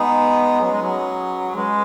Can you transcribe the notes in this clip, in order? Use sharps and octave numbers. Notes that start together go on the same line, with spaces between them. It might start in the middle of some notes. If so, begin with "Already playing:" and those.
Already playing: G#3 B3 D#4 G#4
F#3 C#4 G#4 B4
G#3
F#3
G#3 C#4 G#4 B4